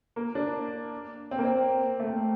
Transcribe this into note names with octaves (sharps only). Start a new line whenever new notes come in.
A#3
D4
C4
A#3
C4
A3
A#3